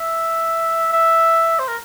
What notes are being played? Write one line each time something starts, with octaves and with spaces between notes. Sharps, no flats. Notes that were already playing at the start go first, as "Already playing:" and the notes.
Already playing: E5
E5
C5
A#4